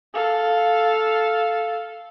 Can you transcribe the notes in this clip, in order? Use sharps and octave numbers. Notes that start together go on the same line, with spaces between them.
A4 F5